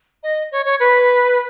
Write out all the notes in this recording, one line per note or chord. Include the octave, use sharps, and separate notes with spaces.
D#5
C#5
C#5
B4